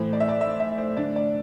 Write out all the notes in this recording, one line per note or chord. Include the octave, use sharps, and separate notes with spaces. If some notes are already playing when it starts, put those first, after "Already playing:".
Already playing: A2 E3 A3 C5
D5
E5
D5
E5
E5
C5
D3 A3 D4 D5
D5